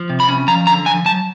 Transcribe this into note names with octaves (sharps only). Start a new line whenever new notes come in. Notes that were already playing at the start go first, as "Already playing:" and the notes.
Already playing: F3
C3
B5
C#4
F3 A#5
D3 A#5
F3 G#5
F#3 A5